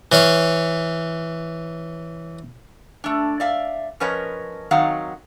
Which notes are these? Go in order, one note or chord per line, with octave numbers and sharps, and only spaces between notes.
E3 C#5 F5 C#6
A3 D4
D5 E5 F5
F3 C#4 A#4 B4 C#5 D#5
D#3 F#3 C4 D#4 F5 F#5